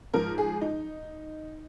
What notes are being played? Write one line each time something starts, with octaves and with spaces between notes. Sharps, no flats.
G#2 F3 A#4
G#4
D#4